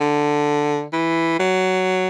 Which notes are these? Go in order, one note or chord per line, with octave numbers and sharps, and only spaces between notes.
D3
E3
F#3